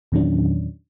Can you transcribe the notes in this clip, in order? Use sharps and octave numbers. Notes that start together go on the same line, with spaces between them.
E2 A#2 D#3 F#3 C#4 D4